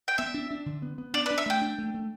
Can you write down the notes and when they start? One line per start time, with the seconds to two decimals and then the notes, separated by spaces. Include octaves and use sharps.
0.08 G5
0.18 B3 E5
0.34 D4
0.51 D4
0.66 D3
0.82 B3
0.98 B3
1.14 D4 D5
1.26 B4
1.30 D4
1.38 E5
1.46 A3 G5
1.62 D4
1.78 A3
1.94 A3